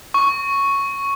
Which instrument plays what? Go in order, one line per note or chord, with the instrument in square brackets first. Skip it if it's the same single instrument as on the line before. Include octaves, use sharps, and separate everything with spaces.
[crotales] C#6